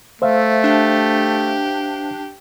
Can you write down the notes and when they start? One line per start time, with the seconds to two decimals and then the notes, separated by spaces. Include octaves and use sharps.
0.22 A3 C5 E5 F5
0.64 D4 G4